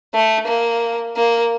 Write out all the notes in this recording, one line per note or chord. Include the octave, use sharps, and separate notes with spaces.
A3
A#3
A#3